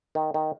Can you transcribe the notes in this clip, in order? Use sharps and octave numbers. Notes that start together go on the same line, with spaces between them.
D#3
D#3